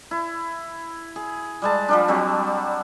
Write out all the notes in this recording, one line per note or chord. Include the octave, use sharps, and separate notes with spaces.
E4
G#4
G3 G#3 A5
F3 G3 D4
F#3 G3 C4